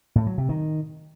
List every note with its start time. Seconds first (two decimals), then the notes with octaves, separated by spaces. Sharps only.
0.16 A2
0.27 F#3
0.38 C3
0.49 D#3